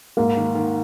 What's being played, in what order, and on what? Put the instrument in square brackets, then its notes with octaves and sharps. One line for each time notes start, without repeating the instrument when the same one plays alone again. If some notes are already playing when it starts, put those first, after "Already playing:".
[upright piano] G#2 [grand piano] A#3
[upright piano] D#3
D#3